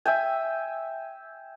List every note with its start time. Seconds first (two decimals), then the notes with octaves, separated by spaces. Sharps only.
0.05 E5 G5 G#5